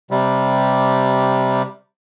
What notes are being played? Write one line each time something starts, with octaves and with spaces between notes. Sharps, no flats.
C3 G3